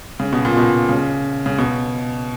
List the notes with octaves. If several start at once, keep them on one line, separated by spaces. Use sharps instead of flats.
C#3
B2
A#2
B2
C#3
C#3
B2